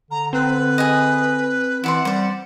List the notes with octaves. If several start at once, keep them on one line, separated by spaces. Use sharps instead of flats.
D3 A#5
C4 B4
G#4 D#5
E3 E4 D5 F#5 C6
G3 C5 D5